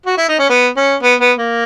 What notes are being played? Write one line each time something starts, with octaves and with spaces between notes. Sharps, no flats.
F#4
E4
D#4
C#4
B3
C#4
B3
B3
A#3